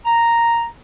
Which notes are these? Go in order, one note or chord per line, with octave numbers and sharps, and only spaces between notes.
A#5